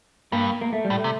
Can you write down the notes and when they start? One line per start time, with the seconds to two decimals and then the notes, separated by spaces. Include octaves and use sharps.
0.32 G2 A#3
0.61 A#3
0.73 A3
0.85 G3
0.90 A2
0.97 A3
1.04 C3